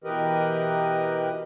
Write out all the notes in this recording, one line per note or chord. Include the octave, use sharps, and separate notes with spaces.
B2 E3 G4 A#4 B4 D#5